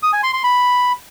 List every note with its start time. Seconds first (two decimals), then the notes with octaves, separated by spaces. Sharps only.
0.03 D#6
0.13 G#5
0.23 C6
0.33 C6
0.44 B5